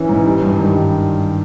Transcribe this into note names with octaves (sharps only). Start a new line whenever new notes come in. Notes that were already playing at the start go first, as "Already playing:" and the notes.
Already playing: E3 C#4
G#2
G3
G2
D#3